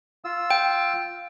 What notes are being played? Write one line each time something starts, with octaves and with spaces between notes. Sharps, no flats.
F4 E6
G5